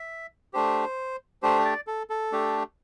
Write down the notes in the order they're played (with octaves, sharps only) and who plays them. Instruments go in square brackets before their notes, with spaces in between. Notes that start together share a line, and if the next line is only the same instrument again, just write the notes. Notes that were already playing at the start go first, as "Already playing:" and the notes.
Already playing: [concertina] E5
A3 D4 G4 C5
A3 D4 G4 C5
D5
A4
A4
A3 D4 G4